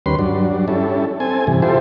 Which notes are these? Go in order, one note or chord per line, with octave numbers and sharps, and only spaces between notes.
D#2 G3 C#4 B4 C6
G2 F#3 D4
G3 C#4 E4 A4
C4 A4 G#5
G2 C3 E3
E4 F4 G4 A4 C5